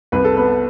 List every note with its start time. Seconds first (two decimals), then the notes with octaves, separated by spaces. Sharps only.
0.12 C2 B4
0.24 A4
0.37 B3 B4